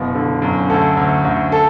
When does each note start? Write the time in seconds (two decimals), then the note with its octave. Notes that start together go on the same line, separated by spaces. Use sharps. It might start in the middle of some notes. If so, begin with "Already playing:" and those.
Already playing: F#1 B2
0.15 D3
0.42 F#2
0.69 D2 A4
0.97 D2
1.25 D2
1.52 A4